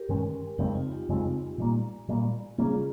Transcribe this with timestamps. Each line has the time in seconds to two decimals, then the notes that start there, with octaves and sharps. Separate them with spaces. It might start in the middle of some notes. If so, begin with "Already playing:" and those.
Already playing: G4 A#4
0.09 G2 D#3 G#3 C#4
0.58 F2 C#3 G#3 C4 D#4 G4
0.75 F4
0.91 D#4 G4
1.09 F2 C#3 G#3 C4
1.58 A#2 G3 A#3
2.08 A#2 G3 A#3
2.58 C#3 G3 A#3 C#4 F4 G#4